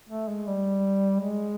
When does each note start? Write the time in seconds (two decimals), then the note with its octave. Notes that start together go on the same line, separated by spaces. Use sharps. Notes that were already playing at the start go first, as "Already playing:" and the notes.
0.09 A3
0.28 G#3
0.47 G3
1.20 G#3